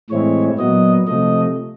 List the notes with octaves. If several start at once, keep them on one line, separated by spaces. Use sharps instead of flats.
A2 E3 G#3 C4 E4 C#5
A#2 F#3 B3 D#5
C3 F3 A3 D#5